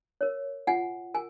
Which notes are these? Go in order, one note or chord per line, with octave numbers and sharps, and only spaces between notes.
A#4 C#5
F4 F#5 G#5
A#4 G#5